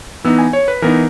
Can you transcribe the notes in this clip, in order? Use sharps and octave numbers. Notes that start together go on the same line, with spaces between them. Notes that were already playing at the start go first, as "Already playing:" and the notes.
E3 B3 D#4 E6
G#5
C#5
B4
E3 B3 D#4 A#4